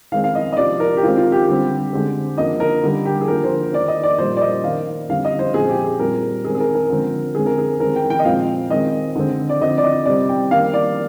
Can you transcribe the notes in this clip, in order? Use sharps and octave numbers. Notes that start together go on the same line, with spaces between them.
D#3 G#3 C4 F5
F5
D#5
D#5
C3 F3 C4 D5
A#4
G4
D#3 G#3 C4 F4
F4
G4
D3 G3 C4
D3 G#3 C4
D3 F3 A#3 D#5
A#4
D3 G3 A#3
G4
G#4
D3 F3 A#3 A#4
C5
D#3 A#3 D5
D#5
D5
A#2 G3 A#3 C5
D5
D#5
D#3 A#3 F5
D3 G3 C4 F5
D#5
C5
A#2 F3 G#3 C4 G#4
G4
G#4
A#2 G3 C4 A#4
D#3 G#3 C4 G#4
G#4
A#4
A#4
D3 F3 G#3 C4
D3 G#3 C4 G#4
A#4
G#4
D#3 G#3 C4 A#4
G5
G5
D#5
A#2 F3 G#3 C4 F5
D#3 G#3 C4 D#5
D3 G#3 C4
D5
D3 F3 C4 D#5
D5
D#5
C3 G3 C4 D5
G5
D#3 G3 A#3 F5
D5